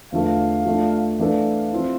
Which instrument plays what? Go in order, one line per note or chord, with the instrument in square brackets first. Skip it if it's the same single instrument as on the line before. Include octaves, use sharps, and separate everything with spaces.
[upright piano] E2 D3 F3 A3 [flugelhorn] F5
[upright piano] F3 A3 D4
[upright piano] E3 A3 D4 A4 [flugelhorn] F5
[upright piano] F3 C4 E4